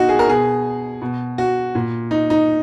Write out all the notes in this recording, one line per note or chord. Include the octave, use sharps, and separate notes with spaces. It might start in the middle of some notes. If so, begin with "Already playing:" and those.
Already playing: B2 D#4 F#4
G#4
A#4
B2 G#4
B2
F#4
A#2
D#4
D#4